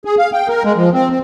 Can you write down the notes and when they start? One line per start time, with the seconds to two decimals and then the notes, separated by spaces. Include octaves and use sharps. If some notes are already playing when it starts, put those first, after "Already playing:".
0.05 G#4
0.18 F5
0.33 G5
0.48 A#4
0.64 G#3
0.76 F3
0.94 C4
1.10 C4